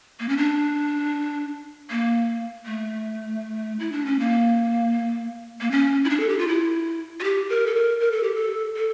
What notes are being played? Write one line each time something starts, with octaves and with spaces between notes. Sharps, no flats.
A#3
C#4
D4
A#3
A3
E4
D4
C#4
A#3
A#3
C#4
E4
D4
A4
G4
F4
E4
F4
G4
A#4
A4
A#4
A#4
A4
G4
A4
A4